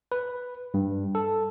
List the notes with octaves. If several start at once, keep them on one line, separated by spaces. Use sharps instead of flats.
B4
G2
A4